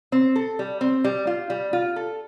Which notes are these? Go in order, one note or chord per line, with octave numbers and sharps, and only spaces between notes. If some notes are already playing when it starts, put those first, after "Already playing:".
C4
A4
G3
C4
G3
F4
G3
F4
A4